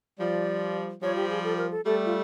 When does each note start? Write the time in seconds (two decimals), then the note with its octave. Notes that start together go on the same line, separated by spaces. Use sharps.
0.19 F3 G3 D5
1.02 F3 G3 C#5
1.16 G4
1.29 G#4
1.44 A4
1.57 A#4
1.71 A4
1.86 G3 A3 A4
2.06 F4